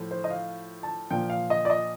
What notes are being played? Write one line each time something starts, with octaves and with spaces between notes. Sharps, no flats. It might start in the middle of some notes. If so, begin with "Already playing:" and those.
Already playing: A2 F3
C5
D#5
F5
A5
A#2 F3 G5
F5
D#5
D5
D#5